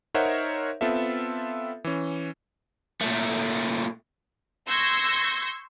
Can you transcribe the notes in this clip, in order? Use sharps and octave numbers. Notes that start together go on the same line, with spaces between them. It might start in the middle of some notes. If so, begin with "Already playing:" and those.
D#4 A#4 C5 C#5 E5 F#5
B3 C4 F4 A4 E5
E3 C#4
A#2 A3
C6 C#6 E6 G6 G#6 A#6